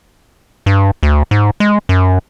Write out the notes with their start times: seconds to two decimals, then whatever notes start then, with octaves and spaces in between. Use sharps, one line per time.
0.66 G2
1.03 D2
1.31 G#2
1.60 G#3
1.89 F#2